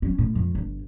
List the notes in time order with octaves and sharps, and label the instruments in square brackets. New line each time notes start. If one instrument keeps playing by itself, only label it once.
[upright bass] F#3 C#4
A2
F2 D#3
G1